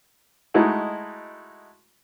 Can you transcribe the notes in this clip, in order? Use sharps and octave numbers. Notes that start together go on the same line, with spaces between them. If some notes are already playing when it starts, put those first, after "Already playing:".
G#3 A3 D#4 E4 F#4